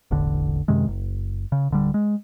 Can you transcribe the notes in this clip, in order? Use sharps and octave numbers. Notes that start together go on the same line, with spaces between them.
E1 A1 D3
F#2 C3 D#3 G#3
F#1
C#3
D1 D3 G3
G#3